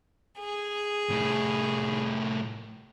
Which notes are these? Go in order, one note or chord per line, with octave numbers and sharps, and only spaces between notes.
G#4
C2 A2